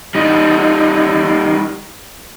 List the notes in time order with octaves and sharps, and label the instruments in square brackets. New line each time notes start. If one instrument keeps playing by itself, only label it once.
[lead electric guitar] G3 D#4